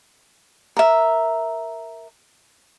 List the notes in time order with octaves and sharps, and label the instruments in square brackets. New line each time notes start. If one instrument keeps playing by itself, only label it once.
[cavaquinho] A#4 E5